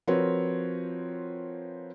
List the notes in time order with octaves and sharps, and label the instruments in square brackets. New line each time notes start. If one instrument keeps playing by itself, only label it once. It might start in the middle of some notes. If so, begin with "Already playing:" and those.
[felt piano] F3 C4 F#4 A#4 B4 C#5